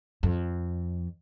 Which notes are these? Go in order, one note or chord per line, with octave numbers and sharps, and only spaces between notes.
F2